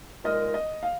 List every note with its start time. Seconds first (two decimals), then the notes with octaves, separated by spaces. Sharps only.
0.24 C2 A#2 G#3 D#4 A#4 D#5
0.54 D#5
0.83 F5